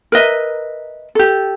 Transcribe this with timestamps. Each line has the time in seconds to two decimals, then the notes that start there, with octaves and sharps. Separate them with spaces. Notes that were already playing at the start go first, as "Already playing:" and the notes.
0.12 A#4 B4 D#5 E5
1.15 G4 A4